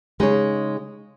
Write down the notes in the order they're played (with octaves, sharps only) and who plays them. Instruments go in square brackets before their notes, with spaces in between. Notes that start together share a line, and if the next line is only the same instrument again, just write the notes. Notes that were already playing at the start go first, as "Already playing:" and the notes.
[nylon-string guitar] C#3 G#3 D#4 G#4 C#5